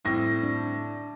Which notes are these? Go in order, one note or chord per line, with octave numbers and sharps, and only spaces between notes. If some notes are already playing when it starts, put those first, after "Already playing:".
A2 G3 C4 A#6
D4